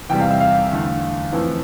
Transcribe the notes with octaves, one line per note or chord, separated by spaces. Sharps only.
E2 C3 G3 G5
F5
E5
F5
E2 D3 A3
F2 E3 A3